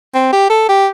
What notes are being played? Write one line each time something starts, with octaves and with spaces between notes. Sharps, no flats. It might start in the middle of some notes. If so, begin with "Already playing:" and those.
C4
G4
A4
G4